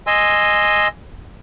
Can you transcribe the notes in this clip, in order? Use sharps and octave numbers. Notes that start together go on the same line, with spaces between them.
D#5 G#5 C6 E6